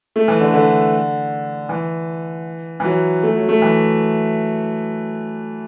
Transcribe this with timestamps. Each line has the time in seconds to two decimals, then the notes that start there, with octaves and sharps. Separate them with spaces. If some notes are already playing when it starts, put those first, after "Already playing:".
0.16 A3
0.28 E3
0.40 D3
0.54 D3
1.69 E3
2.80 E3
2.85 F#3
3.23 A3
3.35 F#3
3.49 A3
3.62 E3